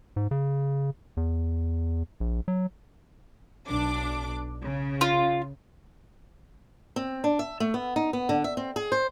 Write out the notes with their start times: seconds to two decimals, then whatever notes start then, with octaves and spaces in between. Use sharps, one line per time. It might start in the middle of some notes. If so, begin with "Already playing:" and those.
0.16 G#2
0.31 C#3
1.17 E2
2.20 A#1
2.48 F#3
3.68 B1 D4 D6
4.62 C#3
5.01 F4
6.96 C4
7.24 D4
7.39 E5
7.60 A3
7.74 B3
7.96 D#4
8.13 B3
8.29 D3
8.44 E5
8.57 C4
8.76 G#4
8.92 C5